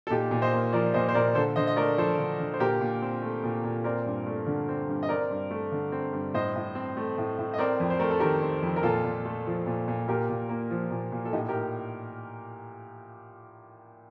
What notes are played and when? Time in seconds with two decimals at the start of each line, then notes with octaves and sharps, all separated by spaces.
0.07 A4
0.10 A#2 D#4 G4
0.31 A#2
0.42 C5 D#5
0.53 A#3
0.73 F3 A#4 D5
0.94 A#2 C5 D#5
1.09 C5
1.14 A#2 A#4 D5
1.35 D3 A4 C5
1.56 D3 C5 D#5
1.67 D#5
1.76 A3 A#4 D5
1.97 F3 A4 C5
2.18 D3
2.40 D3
2.54 C5
2.60 A#2 G4 A#4
2.81 A#2
3.02 C4
3.22 A3
3.44 A#2
3.64 A#2
3.84 C4 A#4 D5
4.06 G2
4.26 A3
4.47 D3
4.69 C4
4.89 G2
5.03 D#5
5.09 C4 A#4 D5
5.31 G2
5.51 A3
5.72 D3
5.92 C4
6.13 G2
6.34 A2 C5 D#5
6.55 A2
6.75 C4
6.97 A3
7.18 A2
7.38 A2
7.54 D#5
7.59 C4 A#4 D5
7.80 F2
7.90 C5
8.00 A3 A#4
8.10 A4
8.20 D#3 G4 A#4
8.42 C4
8.63 F2
8.76 A#4
8.83 A#2 F4 A4
9.05 A#2
9.25 A3
9.46 F3
9.66 A#2
9.88 A#2
10.08 A#2 G4 A#4
10.29 A#2
10.49 A#3
10.71 F3
10.91 A#2
11.12 A#2
11.25 A4
11.33 A2 D#4 G4
11.48 G4 A#4
11.53 A2